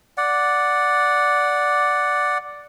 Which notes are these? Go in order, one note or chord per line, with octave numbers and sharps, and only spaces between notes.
D5 F#5